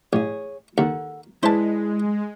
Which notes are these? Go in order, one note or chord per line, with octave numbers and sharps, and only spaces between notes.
A1 G#4 C#5
D#2 A4 F#5
G#3 E4 B4 C5 D5 A5